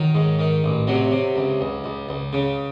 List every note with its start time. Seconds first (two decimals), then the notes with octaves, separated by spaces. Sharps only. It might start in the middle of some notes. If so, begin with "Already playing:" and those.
Already playing: D#3 F#3
0.15 G#2
0.39 D#3
0.64 A1
0.87 C3 F#3
1.11 C3
1.36 C#2
1.61 C#2
1.84 C#2
2.09 C#2
2.33 C#3